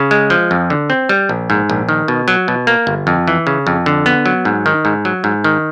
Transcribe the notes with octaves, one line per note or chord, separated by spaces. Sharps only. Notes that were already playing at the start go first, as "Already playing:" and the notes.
Already playing: C#3
G#3
F3
F2
D3
C4
G3
A#1
G#2
A#1
D#3
B2
F#3
B2
A#3
G1
F2
E3
C#3
F2
D3
B3
F#3
G#2
D#3
G#2
F#3
G#2
D#3